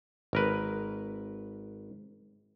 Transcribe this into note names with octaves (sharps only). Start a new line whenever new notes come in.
G#1 A#4 B4